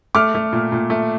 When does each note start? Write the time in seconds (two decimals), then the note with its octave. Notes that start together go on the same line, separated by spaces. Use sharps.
0.15 A3 D6 F6
0.35 A3
0.53 A#2
0.72 A#2
0.90 A3